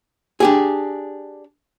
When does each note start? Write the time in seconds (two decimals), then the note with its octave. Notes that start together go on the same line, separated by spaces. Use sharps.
0.40 D4 G4 G#4